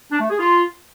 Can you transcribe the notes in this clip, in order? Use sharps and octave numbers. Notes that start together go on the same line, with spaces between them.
D4
A3
G#4
F4